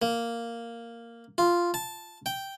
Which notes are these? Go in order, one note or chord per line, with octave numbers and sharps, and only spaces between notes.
A#3
F4
A5
G5